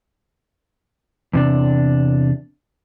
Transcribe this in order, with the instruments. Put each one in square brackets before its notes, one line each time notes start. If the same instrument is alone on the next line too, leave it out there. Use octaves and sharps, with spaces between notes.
[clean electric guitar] E2 C3 D4